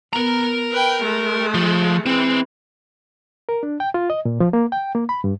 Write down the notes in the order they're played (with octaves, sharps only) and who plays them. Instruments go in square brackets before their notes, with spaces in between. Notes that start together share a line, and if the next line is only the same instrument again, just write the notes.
[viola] B3 [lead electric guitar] A#4 A#5
[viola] B4 G5
G#3 A3
[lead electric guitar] F3
[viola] E3 G#3 [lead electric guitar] C4
[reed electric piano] A#4
D4
G5
F4
D#5
A#2
F3
A#3
G5
A#3
B5
G2